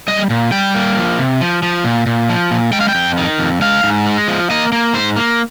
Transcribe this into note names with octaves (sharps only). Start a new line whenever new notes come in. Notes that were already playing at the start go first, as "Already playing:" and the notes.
G3 D#5
A#2
G3 G5
A#3
F3
C3
F3
F3
A#2
A#2
F3
A#2
G#3 G5
F5
G5
F2
D#3
F2
G#3 F5
G#2
G#3
F3
A#3 D#5
A#3
G#2 C5
A#3